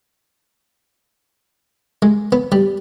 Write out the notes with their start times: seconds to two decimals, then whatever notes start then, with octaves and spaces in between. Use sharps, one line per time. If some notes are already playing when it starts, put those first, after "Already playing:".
2.02 G#3
2.32 B3
2.52 G3